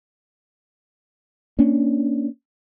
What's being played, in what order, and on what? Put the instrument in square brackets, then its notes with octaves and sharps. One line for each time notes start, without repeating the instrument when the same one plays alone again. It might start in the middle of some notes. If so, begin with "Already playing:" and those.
[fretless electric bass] A#3 C#4 D4